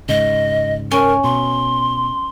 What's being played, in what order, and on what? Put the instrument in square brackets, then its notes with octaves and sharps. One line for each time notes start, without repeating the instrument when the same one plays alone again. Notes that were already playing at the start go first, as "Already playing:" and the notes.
[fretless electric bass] G#2 C#3 [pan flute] D#5
[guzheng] C#4 [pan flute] A#4
[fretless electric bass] B2 [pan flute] C6